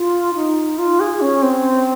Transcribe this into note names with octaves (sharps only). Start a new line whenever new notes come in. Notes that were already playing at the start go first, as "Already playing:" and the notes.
Already playing: F4
D#4
F4
G#4
C#4
C4